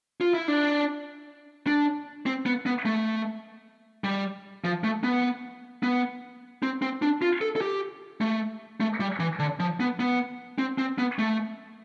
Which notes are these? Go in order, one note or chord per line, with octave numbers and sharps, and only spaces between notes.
F4
E4
D4
D4
C4
B3
B3
A3
G3
F3
A3
B3
B3
C4
C4
D4
F4
A4
A4
G4
A3
A3
G3
E3
D3
F3
B3
B3
C4
C4
B3
A3